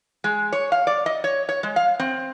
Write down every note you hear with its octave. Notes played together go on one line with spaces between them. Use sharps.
G#3
C#5
F5
D5
D#5
C#5
C#5
G#3
F5
C4